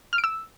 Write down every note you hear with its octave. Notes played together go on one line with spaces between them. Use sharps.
F6
D7
E6